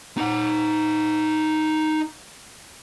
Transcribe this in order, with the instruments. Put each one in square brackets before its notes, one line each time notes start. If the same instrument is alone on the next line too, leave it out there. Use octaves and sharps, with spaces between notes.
[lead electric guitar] D#4 F#5